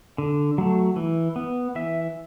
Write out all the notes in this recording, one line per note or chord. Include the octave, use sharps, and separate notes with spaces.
D3
F#3 A3
E3
B3
E3 E5